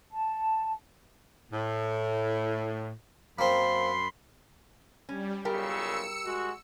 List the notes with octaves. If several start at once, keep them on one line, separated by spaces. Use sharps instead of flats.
A5
A2
F#2 A#3 C4 B5 C6
G3 C#4
B1 A#2 C#3 G3 G4 A#4 E6 C#7
G#3 F#4